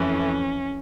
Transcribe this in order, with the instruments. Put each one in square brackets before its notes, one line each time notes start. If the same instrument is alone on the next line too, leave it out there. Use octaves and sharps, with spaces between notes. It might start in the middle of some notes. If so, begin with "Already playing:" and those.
Already playing: [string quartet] F2 E3 A3 C#4